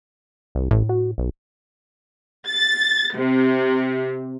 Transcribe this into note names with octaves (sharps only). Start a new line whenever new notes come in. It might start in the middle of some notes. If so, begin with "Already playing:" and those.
C2
A1 A2
F#4
B1
A6
C3